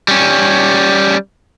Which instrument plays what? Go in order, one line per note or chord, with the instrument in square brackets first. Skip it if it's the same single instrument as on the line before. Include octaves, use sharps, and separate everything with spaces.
[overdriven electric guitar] G3 C#4